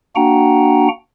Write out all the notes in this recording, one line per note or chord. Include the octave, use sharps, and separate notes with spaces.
A#3 D4 F#4 F#5 G5 A#5